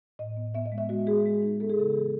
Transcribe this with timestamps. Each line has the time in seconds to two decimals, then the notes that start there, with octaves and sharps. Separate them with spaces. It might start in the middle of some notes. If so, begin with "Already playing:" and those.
0.19 A2 D#5
0.37 B3
0.54 B3 E5
0.66 D#5
0.72 G#3
0.78 E5
0.89 G#3 F#4
1.07 G#3 G#4
1.26 G#3
1.42 D#4
1.60 B3 A4
1.70 G#4
1.79 C#3 A4
1.95 E3